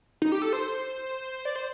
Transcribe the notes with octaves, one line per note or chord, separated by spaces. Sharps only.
D#4
G4
A4
C5
D5
C5